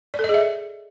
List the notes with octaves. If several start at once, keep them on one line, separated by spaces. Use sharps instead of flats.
D5
A4
D#5
G#4
E5